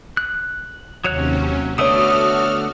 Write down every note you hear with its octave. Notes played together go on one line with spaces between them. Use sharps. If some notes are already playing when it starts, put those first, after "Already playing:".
F#6
D#2 C3 F#3 C#4 C#5 F#6
D3 A3 B3 F#4 A4 C#5 D#6 F6